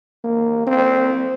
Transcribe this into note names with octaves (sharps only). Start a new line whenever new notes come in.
A#3
C4